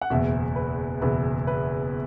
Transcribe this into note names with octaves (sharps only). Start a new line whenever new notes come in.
F#5
F#1 E2 B2 E5
B4
F#1 E2 B2 B4
B4